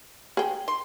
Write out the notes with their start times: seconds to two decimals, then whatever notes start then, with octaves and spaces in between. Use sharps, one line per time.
0.37 G#4 G5
0.68 C6